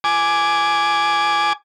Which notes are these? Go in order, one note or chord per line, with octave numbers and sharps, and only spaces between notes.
G#5 D6